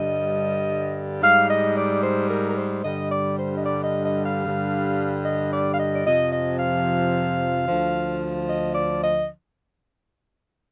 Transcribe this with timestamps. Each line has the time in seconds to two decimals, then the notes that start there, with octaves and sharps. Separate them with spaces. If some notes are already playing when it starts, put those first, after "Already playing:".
Already playing: G2 D3 G3 D#5
1.22 G#2 G3 F5
1.49 D#5
1.76 D5
2.03 C5
2.30 A#4
2.50 A#4
2.57 C5
2.84 G2 D3 G3 D#5
3.10 D5
3.37 C5
3.57 D#5
3.64 D5
3.84 D#5
4.05 D#5
4.24 F5
4.45 G2 D3 G3
5.25 D#5
5.52 D5
5.74 F5
5.79 D#5
5.94 D5
6.06 F2 C3 F3 D#5
6.33 D#5
6.59 F5
7.68 D2 D3 F3
8.48 D#5
8.74 D5
9.02 D#5